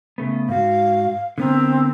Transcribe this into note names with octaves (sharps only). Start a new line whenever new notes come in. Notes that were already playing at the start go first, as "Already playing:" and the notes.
C#3 A3 B3
G#2 F#4 F5
D3 B3 C4 A#4